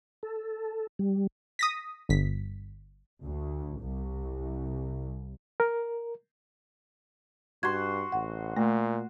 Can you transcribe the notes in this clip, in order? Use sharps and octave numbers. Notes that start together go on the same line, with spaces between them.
A4
G3
D#6 A#6 B6
G1 B6
D2
C2
A#4
G2 F#4 C6 G#6
A1 F#5
A#2 A3